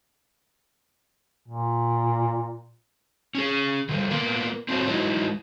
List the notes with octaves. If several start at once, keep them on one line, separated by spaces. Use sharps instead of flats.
A#2
C#4 G#4
D3 F3 G3
A#3 B3 F4 A#4
C4 D4 F4 F#4 A#4 C#5
F#3 G#3 D#4 E4